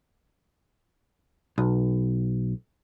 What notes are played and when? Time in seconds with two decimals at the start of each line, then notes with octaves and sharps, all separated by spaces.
1.58 B1